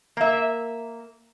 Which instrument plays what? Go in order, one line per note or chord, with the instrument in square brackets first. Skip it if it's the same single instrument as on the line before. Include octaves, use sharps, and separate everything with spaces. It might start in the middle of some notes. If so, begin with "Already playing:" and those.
[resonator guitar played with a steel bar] A#3 E5